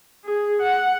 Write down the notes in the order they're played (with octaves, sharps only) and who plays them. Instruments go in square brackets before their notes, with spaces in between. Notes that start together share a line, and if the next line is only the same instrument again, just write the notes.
[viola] G#4
F#5